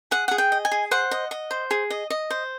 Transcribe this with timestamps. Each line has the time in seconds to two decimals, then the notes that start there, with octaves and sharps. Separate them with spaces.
0.11 G#4 F#5
0.28 G#4 F#5
0.38 G5
0.52 D#5
0.65 G#5
0.72 G#4
0.91 C5 F#5
1.11 D#5
1.31 D#5
1.51 C5
1.71 G#4
1.90 D#5
2.10 D#5
2.30 C5